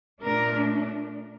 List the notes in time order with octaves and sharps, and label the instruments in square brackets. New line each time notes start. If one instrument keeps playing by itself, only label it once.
[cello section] A#2 A3 D4 A#4